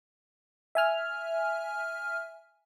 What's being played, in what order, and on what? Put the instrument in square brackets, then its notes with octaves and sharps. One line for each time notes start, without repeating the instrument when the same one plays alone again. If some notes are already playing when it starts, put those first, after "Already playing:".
[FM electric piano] E5 G#5 F6